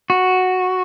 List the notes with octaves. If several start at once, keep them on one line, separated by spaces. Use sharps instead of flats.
F#4